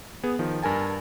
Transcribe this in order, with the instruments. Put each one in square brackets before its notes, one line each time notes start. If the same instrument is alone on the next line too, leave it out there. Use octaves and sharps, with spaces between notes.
[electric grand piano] B3 G#4
D#3 F3
G2 A#4 G#5 A5